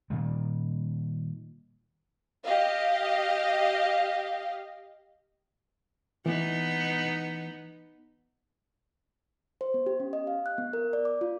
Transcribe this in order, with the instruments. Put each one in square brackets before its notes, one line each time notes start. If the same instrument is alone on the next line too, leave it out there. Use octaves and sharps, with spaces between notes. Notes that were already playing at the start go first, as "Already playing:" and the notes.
[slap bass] A#2 D#3 G3
[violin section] G4 D#5 F5
[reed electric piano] E3 [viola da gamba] B3 D#4
[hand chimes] C5
B3
G4
C#4
D#5
F5
F#6
B3
A#4
D5
D6
F4